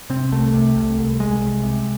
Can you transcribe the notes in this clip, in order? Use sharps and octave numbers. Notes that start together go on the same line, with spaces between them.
C3 C4
C2 A3
C3
C2
C2
C2 G#3
C2
C3